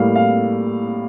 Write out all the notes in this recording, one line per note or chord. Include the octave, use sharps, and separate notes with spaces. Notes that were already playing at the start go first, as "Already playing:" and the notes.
Already playing: A2 G3 A#3 F5
F5